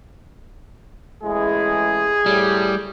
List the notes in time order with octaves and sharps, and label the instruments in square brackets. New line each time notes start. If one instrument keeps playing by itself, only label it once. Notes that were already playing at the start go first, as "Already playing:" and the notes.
[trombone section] A1 G#3 E4 [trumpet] G#4
[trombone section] A2 [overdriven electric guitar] G3